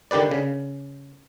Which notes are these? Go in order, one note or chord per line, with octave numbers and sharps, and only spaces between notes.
D3 D#3 G4 B4 D5
C#3